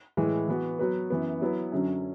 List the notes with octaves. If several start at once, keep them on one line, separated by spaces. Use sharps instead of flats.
A2 E3 G#3
E3 B3 F#4
F#3 B3 F#4 B4
F#2 E3 B3
F#3 B3 E4 B4
F#2 D3 F#3 C#4